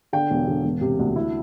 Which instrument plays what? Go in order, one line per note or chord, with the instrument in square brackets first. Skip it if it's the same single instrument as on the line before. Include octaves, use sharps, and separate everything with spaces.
[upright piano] D3 G5
E1
D3
E1
C3
D2
E4